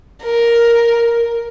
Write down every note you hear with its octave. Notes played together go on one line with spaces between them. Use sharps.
A#4